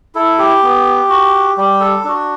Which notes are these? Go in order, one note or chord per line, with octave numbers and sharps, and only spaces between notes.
E4 A4
G4
B3
F#4
G3 G4
A4
D4 F#4